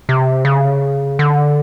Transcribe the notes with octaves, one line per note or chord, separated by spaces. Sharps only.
C3
C#3
D3